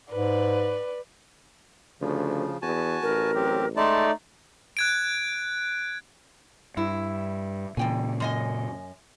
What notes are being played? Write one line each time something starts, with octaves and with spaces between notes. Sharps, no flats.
G#2 B4 D5
D2 C#3 F3
E2 F#4 G#5 A5
A1 A#4
F#3 C4 G4
G#3 A3 D#4 D5 A5 C6
F#6 G#6 D7
G2 E4
E2 A#2 C#3 G5 G#5
F#2 D#5 G#5